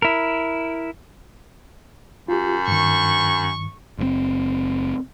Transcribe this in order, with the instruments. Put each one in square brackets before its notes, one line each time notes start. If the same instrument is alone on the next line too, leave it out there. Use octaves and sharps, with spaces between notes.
[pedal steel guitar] E4 A#4
[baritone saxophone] F#2 [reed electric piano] F4 G4
[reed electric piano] G2 D#3 [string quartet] C#6
[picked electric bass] F#1 A#2 C4